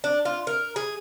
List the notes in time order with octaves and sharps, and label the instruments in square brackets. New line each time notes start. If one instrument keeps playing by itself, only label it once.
[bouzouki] D4
F4
A#4
G#4